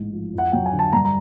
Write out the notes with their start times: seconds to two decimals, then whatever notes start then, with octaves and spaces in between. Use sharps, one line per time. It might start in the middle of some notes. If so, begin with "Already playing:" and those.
Already playing: A1 G#2
0.13 F3
0.34 F2 F#5
0.52 F#3 G5
0.66 G#5
0.72 D3
0.79 A5
0.93 G2 A#5
1.05 A#5